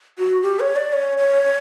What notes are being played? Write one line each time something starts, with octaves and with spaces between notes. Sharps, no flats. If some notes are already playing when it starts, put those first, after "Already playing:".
F#4
G4
C#5
D5
C#5
C#5